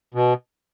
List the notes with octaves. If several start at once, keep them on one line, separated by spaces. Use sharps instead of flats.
B2